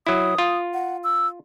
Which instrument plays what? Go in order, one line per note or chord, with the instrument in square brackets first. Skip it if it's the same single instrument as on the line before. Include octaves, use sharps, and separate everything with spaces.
[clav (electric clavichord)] F#3 E4 [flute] D#6
[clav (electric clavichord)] F4
[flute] F#5
E6